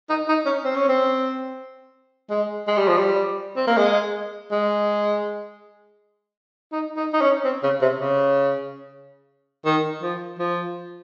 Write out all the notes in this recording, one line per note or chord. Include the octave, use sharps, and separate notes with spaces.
D#4
D#4
C#4
C4
C#4
C4
G#3
G#3
G3
F3
G3
C4
A#3
G#3
G#3
D#4
D#4
D#4
C#4
C4
C#3
C3
C#3
D#3
F3
F3